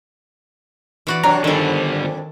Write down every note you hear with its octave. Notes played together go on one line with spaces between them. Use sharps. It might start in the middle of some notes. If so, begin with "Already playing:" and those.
E3 F#4 D5
C3 F#3 D4 C#5 A#5
F2 G#2 D3 D#3 G3 D4 A4